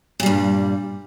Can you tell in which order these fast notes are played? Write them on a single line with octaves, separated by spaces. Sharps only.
A#2 G3 G2